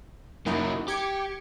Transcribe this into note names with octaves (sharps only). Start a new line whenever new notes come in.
F#2 F#3 A#3 D#4 E4
G4 D6 G#6 C#7